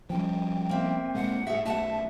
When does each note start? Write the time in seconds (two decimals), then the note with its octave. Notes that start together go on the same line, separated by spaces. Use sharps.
0.10 F3 G3 C#4 G5
0.69 A#3 C4 E5
1.15 A#2 G#3 F#5
1.47 A2 G#4 E5
1.66 B1 A3 E5 F#5 A5